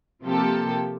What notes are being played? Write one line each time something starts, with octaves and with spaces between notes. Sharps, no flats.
C3 F3 A#3 F4 G4 A4